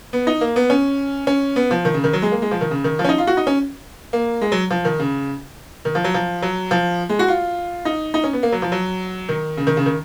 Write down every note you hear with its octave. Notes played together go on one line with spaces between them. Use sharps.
B3
D#4
A#3
B3
C#4
C#4
B3
F3
D#3
C#3
D#3
F#3
G#3
A#3
G#3
F3
D#3
C#3
D#3
F3
C#4
D#4
F4
F#4
D#4
C#4
A#3
G#3
F#3
F3
D#3
C#3
D#3
F3
F#3
F3
F#3
F3
G#3
F#4
F4
D#4
D#4
C#4
B3
A#3
F#3
F3
F#3
D#3
C#3
D#3
C#3
D#3